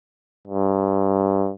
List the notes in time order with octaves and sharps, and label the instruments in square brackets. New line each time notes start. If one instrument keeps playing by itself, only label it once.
[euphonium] G2